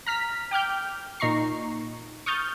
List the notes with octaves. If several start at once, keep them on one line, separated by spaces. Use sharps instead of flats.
A#5 F6 B6
G5 D6 F6 G6
A#2 D#4 A#5 C#6 C7
C#6 D#6 F6 G6 A6